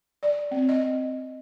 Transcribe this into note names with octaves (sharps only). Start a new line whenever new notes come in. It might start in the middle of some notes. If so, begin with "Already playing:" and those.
D5
C4
D#5